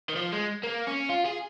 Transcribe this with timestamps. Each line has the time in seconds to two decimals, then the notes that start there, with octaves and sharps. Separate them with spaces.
0.09 D#3
0.16 F3
0.32 G#3
0.63 A#3
0.87 C#4
1.10 F4
1.26 G#4